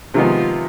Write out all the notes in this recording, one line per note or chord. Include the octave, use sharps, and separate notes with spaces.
C3 D#3 F3 G#3 B3 D#4 F4